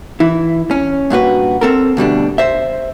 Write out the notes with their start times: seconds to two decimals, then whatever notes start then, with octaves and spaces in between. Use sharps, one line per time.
0.20 E3 E4
0.71 C#4
1.10 G2 A#2 F#4 B4
1.61 C4 A4 A#4
1.97 D2 B2 G3 D4
2.38 C5 E5